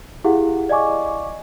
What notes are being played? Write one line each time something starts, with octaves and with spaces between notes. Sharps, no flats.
E4 G4 G#4 F5 F#5
D5 D#5 F5 G#5 C#6 D6